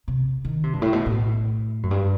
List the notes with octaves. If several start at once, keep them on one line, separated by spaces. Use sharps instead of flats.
C3
D#3
C3
G2
A2
B2
A2
F#2
G2